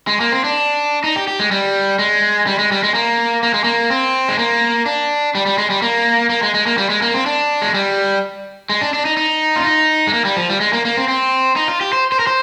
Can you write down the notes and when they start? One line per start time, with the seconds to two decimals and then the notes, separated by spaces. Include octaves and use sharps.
0.08 G#3
0.20 A#3
0.32 C4
0.44 D4
1.04 D#4
1.16 G4
1.27 G4
1.39 G#3
1.51 G3
1.99 G#3
2.47 G3
2.59 G#3
2.72 G3
2.83 G#3
2.94 A#3
3.43 A#3
3.54 G#3
3.64 A#3
3.90 C4
4.29 G#3
4.39 A#3
4.86 D4
5.35 G3
5.46 G3
5.58 G#3
5.70 G3
5.82 A#3
6.30 A#3
6.43 G#3
6.54 G#3
6.66 A#3
6.78 G3
6.90 G#3
7.02 A#3
7.14 C4
7.26 D4
7.62 G#3
7.74 G3
8.70 G#3
8.81 D4
8.93 D4
9.05 D#4
9.17 D#4
9.56 F4
9.65 D#4
10.07 G#3
10.13 A#3
10.25 G3
10.36 F3
10.49 G3
10.60 G#3
10.73 A#3
10.85 A#3
10.97 C4
11.08 C4
11.56 D#4
11.68 F4
11.81 G4
11.93 C5
12.12 C5
12.19 A#4
12.27 C5